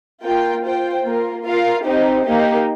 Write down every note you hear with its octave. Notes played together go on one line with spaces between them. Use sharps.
A#3 F4 A#4 G5
F4 C5 G5
A#3 F4 A#4
F4 A#4 F5
C4 D#4 G4 C5
A#3 D#4 G4